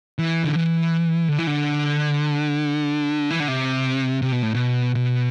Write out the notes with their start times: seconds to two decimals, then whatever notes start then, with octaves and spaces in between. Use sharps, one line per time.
0.19 E3
0.45 D3
0.56 E3
1.28 D3
1.38 E3
1.47 D3
3.30 E3
3.40 D3
3.48 C3
4.22 C3
4.32 B2
4.43 A2
4.54 B2
4.95 B2